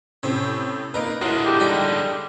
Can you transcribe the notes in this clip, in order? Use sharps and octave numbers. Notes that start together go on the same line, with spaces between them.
A2 C3 C4 C#4
A#3 D#4 A#4 B4
A2 D3 G#3 F#4 A#4
G4
G3 D#4 G4